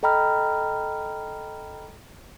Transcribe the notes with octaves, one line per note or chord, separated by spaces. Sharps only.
A4 D#5 G5 A#5 B5 F6